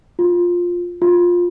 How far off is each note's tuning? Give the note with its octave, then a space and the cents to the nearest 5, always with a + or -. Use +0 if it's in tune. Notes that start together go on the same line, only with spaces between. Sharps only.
F4 +10
F4 +15